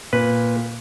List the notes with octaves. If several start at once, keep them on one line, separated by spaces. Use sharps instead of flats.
A#2 B4